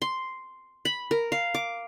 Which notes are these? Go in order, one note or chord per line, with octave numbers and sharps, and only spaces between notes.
C6
B5
A#4
F5
D6